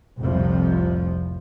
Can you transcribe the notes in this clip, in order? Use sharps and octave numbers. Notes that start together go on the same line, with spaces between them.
F1 C2 F2 A2 C3 F3